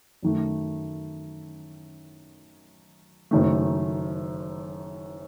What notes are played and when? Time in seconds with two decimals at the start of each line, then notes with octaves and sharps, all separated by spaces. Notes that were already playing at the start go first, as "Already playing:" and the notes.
0.23 F#2 D#3 A3
3.31 F#1 F#2 D#3 A3